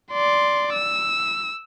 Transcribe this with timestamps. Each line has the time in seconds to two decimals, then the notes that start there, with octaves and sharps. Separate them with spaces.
0.12 D5 C6
0.73 E6